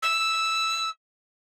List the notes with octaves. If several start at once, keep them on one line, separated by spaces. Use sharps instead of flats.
E6